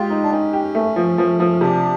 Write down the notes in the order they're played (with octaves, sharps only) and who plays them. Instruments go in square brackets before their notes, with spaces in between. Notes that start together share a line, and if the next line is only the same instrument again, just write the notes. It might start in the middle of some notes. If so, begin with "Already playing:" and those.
Already playing: [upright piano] G#3 G4 [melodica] F4
[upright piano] D#4
[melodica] D4
[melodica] C#4 [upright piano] D#4
[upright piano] G4
A3
F3
F3
F3
[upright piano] C3 [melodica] D4